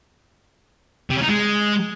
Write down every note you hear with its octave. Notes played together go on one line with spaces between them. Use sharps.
C3
C#4
D#4
G#3